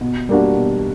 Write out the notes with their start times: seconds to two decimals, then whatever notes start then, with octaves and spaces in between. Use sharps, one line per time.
0.01 B2
0.29 G3 A#3 D4 F#4
0.56 B2